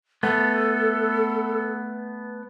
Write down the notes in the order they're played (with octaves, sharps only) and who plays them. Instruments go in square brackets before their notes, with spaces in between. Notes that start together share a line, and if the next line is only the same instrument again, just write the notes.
[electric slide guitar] A3 B3 [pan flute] A4